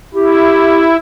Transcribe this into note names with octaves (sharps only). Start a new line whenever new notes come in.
E4 G4